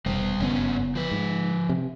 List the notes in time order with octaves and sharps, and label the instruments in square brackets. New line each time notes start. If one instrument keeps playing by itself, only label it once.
[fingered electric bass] E1 E2 [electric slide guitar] G3 C5
[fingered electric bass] F#1 B3 [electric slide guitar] G2 C#4 C#5
[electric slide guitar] F3 B4
[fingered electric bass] G#2
C3